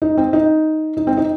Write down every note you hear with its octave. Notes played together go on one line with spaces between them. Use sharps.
D#4
C4
D#4
D#4
C4
D#4